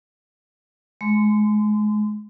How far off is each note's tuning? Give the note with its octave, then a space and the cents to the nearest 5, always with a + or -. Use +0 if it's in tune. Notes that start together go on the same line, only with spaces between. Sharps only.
G#3 +30 C6 -35